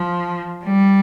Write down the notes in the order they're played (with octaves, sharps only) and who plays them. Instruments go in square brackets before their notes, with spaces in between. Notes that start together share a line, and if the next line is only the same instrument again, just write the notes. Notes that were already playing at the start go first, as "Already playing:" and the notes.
Already playing: [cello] F3
G3